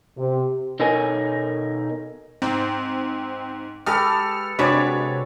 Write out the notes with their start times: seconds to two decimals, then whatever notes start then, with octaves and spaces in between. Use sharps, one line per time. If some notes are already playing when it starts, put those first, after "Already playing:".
0.17 C3
0.80 B2 D#4 A4 A#4 C#5 G#5
2.42 G#2 C4
3.86 G#3 G4 A4 B4 D#6 F6
4.59 C3 G#3 D4 F#4 B4 C#5 D5 B6